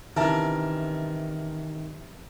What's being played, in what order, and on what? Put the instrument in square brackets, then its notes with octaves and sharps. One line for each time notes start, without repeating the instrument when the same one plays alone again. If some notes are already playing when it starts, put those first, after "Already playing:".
[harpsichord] C3 E3 C#4 [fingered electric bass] D#3 [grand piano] A#4 A5